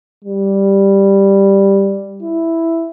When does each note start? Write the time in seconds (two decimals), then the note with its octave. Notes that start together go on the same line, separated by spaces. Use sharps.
0.24 G3
2.22 E4